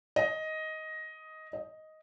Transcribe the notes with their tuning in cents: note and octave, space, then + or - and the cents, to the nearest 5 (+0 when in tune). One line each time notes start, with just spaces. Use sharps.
D#5 +10
D#5 +5